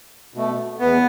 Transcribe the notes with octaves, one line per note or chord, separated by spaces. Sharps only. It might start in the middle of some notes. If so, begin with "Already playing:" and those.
B2 A3
E2 B3